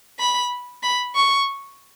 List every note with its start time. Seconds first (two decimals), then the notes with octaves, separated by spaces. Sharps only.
0.19 B5
0.83 B5
1.15 C#6